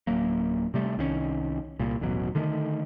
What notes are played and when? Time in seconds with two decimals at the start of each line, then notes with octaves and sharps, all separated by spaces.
0.07 D1 F#3 A#3
0.74 C3 G3 A3
0.98 C2 D#3 F3 C#4
1.79 C2 A#2
2.01 D#1 A1 B2 F#3
2.35 D3 D#3 A3